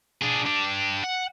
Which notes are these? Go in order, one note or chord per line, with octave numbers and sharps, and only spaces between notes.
D4 G#4
D4 G4
F#5